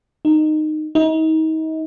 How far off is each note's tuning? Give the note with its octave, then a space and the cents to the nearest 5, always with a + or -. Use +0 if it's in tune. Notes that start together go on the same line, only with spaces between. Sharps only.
D#4 -15
D#4 +35